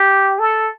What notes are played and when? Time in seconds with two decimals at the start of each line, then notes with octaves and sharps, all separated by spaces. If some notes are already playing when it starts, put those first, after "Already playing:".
Already playing: G4
0.39 A4